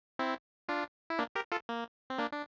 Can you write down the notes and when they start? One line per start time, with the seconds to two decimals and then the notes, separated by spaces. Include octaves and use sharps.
0.19 C4 E4
0.69 D4 F4
1.10 E4
1.19 A#3 D4
1.35 G4 A#4
1.52 F4 A4
1.69 A#3
2.10 C4
2.18 A#3 D4
2.32 D4